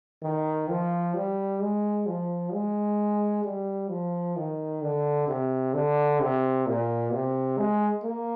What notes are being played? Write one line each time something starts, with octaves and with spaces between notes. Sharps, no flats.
D#3
F3
G3
G#3
F3
G#3
G3
F3
D#3
D3
C3
D3
C3
A#2
C3
G#3
A#3